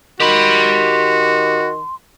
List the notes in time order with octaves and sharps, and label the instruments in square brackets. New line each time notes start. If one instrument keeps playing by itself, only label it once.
[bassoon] D#3 [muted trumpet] F#4 [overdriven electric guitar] G4 B5 [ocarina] C6